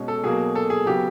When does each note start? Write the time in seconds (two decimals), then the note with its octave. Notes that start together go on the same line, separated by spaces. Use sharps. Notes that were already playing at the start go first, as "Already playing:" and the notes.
Already playing: B2 G#3 C#4
0.08 A4
0.23 B2 F#3 A#3 G#4
0.55 A4
0.70 G#4
0.86 C#3 F#3 B3 G4